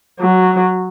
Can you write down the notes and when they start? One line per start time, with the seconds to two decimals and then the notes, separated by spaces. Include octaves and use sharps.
0.20 F#3